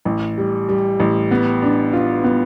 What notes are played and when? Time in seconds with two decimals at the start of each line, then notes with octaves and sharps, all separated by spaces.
0.05 A1
0.38 G3
0.69 G3
1.00 A1
1.31 B3
1.62 D4
1.93 F4
2.24 B3